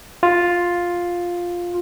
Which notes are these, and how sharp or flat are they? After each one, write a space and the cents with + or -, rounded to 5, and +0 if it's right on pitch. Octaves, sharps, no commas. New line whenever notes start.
F4 +5